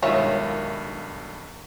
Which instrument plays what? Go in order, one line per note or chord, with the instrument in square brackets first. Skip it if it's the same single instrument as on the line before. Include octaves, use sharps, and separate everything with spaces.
[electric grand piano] B1 G2 G#3 [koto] D#3 [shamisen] F4 C#5 [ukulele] E5